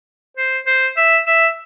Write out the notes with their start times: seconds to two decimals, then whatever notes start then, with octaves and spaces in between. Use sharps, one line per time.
0.37 C5
0.67 C5
0.97 E5
1.27 E5